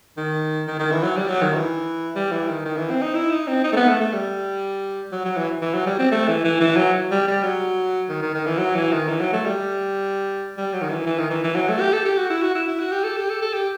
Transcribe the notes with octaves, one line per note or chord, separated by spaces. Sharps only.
D#3
D#3
D#3
E3
F#3
G3
F#3
D#3
E3
G3
E3
D#3
D#3
E3
C4
D#4
E4
D#4
C4
D#4
A3
B3
A3
A3
G3
F#3
F#3
E3
E3
F#3
G3
C4
A3
E3
E3
E3
F#3
G3
G3
F#3
D#3
D#3
D#3
E3
F#3
E3
D#3
E3
F#3
A3
G3
G3
F#3
D#3
E3
E3
D#3
E3
E3
F#3
A3
G4
A4
G4
F#4
E4
F#4
E4
E4
F#4
G4
A4
G4
A4
A4
G4